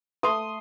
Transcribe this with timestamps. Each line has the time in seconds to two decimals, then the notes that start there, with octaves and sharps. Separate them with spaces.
0.23 A3 C6 D#6